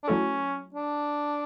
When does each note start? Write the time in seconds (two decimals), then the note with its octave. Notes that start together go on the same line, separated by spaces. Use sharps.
0.03 D4
0.08 F#3 A3 C#4 E4 A4
0.74 D4